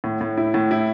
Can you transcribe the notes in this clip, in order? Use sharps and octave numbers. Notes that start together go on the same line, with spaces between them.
A2
A2
E4
A2
E4